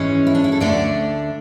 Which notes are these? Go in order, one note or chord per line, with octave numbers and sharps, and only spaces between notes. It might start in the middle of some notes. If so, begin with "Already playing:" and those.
Already playing: G#2 E3 G#3 C#4
E4
D4
E4
A4
D2 D3 A3 D4 D5